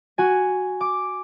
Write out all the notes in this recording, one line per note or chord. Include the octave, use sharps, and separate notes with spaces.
F#4 G#5
D6